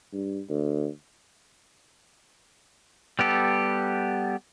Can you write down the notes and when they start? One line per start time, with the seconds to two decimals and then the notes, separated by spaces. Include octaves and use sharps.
0.13 G2
0.49 D2
3.19 G3 B3 G4 A4